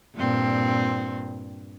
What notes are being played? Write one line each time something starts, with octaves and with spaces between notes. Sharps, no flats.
G2 A#2 C4